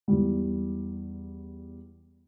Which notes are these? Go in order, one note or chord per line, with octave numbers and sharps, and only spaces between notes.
E2 G3